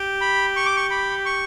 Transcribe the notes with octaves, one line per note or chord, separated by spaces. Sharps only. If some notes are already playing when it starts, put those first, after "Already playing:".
Already playing: G4
B5
C#6
D6
C#6
B5
C#6